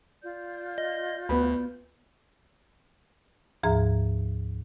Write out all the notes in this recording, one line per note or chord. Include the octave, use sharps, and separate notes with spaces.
F4 D5 G6
D#5
D2 B3 B4 B5
D2 G#2 F3 G#4 E5 A#5